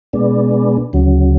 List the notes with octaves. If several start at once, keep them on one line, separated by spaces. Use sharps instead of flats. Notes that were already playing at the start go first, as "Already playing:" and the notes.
B2 G#3 B3 D4
D2 C#3 F#3